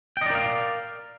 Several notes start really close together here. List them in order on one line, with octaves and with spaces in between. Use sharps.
G5 D#5 D5 A#4 F5